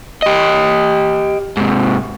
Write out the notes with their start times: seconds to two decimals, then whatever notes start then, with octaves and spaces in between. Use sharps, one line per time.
0.22 G4 D#5
1.57 G#2 C3